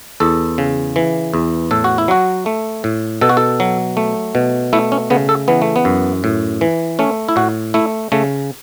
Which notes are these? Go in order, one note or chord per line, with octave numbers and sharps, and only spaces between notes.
E2 A4
C#3
E3
E2
A2 A4
F#4
E4
F#3 F#4
A3
A2
B2 A4
F#4
A4
F#3
A3
B2
A3 E4
C#4
C#3 B3
A4
E3 B3
A3
B3
F#2
A2
E3
A3 C#4
E4
A2 F#4
A3 E4
C#3 A3